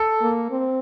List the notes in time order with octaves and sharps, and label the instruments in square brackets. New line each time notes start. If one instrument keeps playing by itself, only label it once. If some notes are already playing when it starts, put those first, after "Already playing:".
Already playing: [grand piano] A4
[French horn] A#3
C4